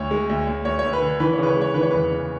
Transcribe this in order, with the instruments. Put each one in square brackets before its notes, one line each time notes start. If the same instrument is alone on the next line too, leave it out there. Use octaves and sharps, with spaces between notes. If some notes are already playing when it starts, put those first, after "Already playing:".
Already playing: [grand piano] D2 C#5
G#3
D2
D2
D2 C#5
C#5
D2
B4
D3
E3 B4
C#5
C#3 B4
C#5
G#3
C#5
E3 B4
C#5
E2 B4
C#3